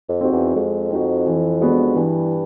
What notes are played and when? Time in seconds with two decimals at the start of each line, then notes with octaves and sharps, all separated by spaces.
0.09 F2
0.21 C4 D#4 F#4
0.32 E2
0.55 F2 G#3
0.90 C4 D#4 F#4
1.26 E3
1.61 G#3 B3 D4 F#4
1.95 G2 E3